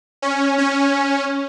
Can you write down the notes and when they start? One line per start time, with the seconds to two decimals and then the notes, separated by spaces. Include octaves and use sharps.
0.22 C#4
0.58 C#4